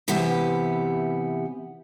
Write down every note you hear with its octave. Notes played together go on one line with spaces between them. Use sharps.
C3 E3 B3 G4 E5